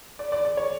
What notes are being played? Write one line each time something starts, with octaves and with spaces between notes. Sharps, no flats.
D5
D5
D5
C#5